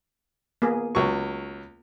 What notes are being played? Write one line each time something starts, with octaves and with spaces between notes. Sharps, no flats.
A#3 B3 G#4
C#2 F#3 C#6